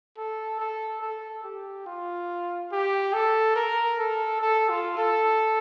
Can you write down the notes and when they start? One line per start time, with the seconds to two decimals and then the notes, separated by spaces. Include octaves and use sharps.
0.18 A4
0.60 A4
1.02 A4
1.44 G4
1.87 F4
2.72 G4
3.14 A4
3.56 A#4
3.99 A4
4.41 A4
4.69 F4
4.98 A4